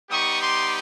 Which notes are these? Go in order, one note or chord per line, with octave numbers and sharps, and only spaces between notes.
G3 B3 D#4 G4 C#6 D#6
C6 D6